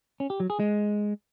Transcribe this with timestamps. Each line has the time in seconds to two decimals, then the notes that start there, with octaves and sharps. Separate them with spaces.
0.20 C#4
0.30 G4
0.40 F#3
0.50 G#4
0.60 G#3